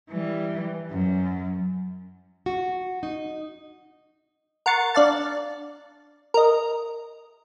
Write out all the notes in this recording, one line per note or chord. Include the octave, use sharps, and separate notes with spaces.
E3 G3
F#2
F#4
D#4
A#4 F#5 C6 C#6 A6
D4 D5 F5 A5
A#4 D#5